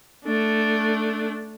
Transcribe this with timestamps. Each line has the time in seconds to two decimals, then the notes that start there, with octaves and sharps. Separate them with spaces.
0.25 A3 D4